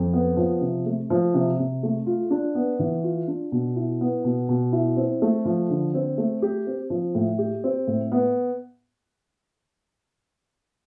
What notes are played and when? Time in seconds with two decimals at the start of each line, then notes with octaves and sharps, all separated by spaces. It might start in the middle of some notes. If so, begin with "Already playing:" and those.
Already playing: F2
0.13 B3
0.37 F3
0.61 C3
0.86 A3
1.10 F3
1.34 C3
1.59 C3
1.83 A3
2.07 F4
2.31 D4
2.55 B3
2.79 E3
3.04 F4
3.28 D4
3.52 B2
3.76 E4
4.01 B3
4.24 B2
4.49 B2
4.73 E4
4.97 C4
5.22 A3
5.45 F3
5.70 D3
5.94 C4
6.18 A3
6.42 G4
6.67 C4
6.90 F3
7.15 A2
7.39 G4
7.64 C4
7.87 A2
8.12 B3